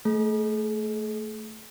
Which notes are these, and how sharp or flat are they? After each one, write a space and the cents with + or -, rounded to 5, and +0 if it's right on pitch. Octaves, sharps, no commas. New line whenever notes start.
A3 +0 G#4 +40